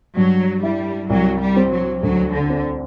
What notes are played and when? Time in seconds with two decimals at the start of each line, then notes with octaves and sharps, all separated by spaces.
0.16 G2 F#3
0.63 G3 E4
1.10 C2 F#3
1.41 G3
1.57 C4
1.72 F#3
2.03 D2 F#3
2.33 D3
2.50 C4